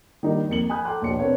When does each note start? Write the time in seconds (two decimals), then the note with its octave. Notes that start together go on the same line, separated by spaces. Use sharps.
0.23 D#3 G3 A#3 D#4 G4 A#4
0.49 F2 A#3 C#7 F#7
0.70 G#5 B5 D#6 F#6 G6
0.85 A4 G5 A#5 C6 D6 F#6
1.02 A#1 B2 C#5 C#7
1.19 C4 D4 A#4 B4 C#5 F5